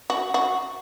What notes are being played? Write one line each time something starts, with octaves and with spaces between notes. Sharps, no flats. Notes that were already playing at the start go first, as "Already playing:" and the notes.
F#4
F#4